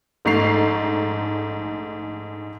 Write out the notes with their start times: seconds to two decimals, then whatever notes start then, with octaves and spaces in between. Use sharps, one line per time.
0.25 A#1 G#2 A3 C#6 C7 F7